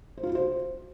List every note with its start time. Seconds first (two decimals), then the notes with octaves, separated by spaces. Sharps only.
0.18 C5
0.23 F4
0.29 F#4
0.35 C5